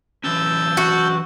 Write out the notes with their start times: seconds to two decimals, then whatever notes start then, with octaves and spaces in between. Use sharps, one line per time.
0.24 E3 F#3 C#4 A5 E6 G6
0.77 F#4